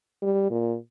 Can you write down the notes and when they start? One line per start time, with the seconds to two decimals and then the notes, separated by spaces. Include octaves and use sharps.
0.22 G3
0.50 A#2